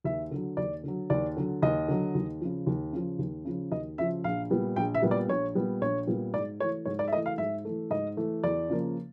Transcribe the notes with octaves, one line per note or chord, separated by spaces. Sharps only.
D#2 E5
D3 F#3
D#2 D5
D3 F#3
D#2 D5
D3 F#3
D#2 D#5
D3 F#3
D#2
C#3 F3
D#2
C#3 F3
D#2
C#3 F3
D#2 D#5
C#3 F3 E5
A#1 F5
A#2 G3 B3
A#1 G5
E5
A#2 G3 B3
D5
A#1 C#5
A#2 G3 B3
A#1 C#5
A#2 G3 B3
G#2 D5
E3 A3 C#5
G#2 C#5
D5
E5
E3 A3 D#5
F5
G#2 E5
E3 A3
G#2 D#5
E3 A3
E2 D5
C#3 F3 A#3